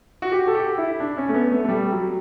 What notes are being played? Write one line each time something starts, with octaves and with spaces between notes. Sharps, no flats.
F#4
G4
A4
G4
E4
D4
C#4
A3
B3
A3
A3
G3
F#3